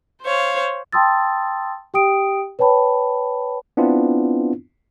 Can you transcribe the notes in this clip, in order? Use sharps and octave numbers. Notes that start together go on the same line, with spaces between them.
C5 C#5 F5
G5 A5 C6 D#6 E6 A6
G4 G5 D#6 D7
B4 C#5 G5 A5 B5
B3 C4 D4 E4 F4